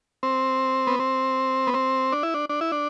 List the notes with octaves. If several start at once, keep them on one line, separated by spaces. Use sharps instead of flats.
C4
B3
C4
B3
C4
D4
E4
D4
D4
E4
D4